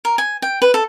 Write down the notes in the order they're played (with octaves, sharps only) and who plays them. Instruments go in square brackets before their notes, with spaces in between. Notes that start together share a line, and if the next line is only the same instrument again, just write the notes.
[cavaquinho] A#4
G#5
G5
B4
A4